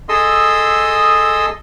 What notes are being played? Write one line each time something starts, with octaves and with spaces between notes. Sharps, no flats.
G#4 A4 D#5 C6 D#6 E6